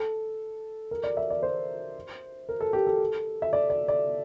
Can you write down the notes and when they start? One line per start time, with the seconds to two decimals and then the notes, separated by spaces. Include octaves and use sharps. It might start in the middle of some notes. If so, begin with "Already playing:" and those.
Already playing: A4
0.91 A#4
1.04 D5
1.17 E5
1.30 D5
1.43 C5
2.49 A#4
2.61 A4
2.73 G4
2.87 A4
3.42 E5
3.53 D5
3.70 D5
3.88 D5